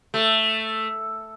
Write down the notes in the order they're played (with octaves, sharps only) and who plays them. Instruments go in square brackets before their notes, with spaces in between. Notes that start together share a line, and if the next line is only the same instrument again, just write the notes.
[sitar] A3